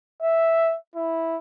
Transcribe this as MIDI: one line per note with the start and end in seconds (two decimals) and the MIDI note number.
0.22 0.76 76
0.95 1.37 64